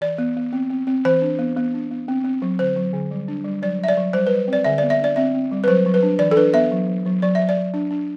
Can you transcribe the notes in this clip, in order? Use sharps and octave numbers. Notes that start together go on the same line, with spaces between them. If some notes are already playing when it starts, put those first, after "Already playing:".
E3 D5
B3
B3
C4
C4
C4
E3 C5
D4
B3
B3
D4
B3
C4
C4
F#3
D3 C5
F#3
D3
G3
D4
G3
F#3 D5
F#3 E5
D5
F#3
G3 C5
B4
G3
C4
D5
D3 E5
D5
B3
E5
D4 D5
C4 E5
C4
G3
B4
F#3 C5
F#3
B4
D4
E3 D5
A4
D4 B4
B3 E5
F#3
F#3
F#3
F#3 D5
F#3 E5
D5
F#3
D4
D4